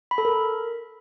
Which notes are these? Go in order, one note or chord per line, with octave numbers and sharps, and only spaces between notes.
B5
A4
A#4